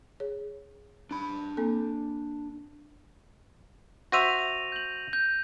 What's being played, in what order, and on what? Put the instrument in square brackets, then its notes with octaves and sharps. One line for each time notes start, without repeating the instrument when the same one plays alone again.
[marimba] G#4 C#5
[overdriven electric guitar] D4 B5
[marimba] A#3 C4 A4
[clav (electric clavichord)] F#4 C5 E5 [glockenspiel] A#6 D#7 F7
[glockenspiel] G6 F#7
G6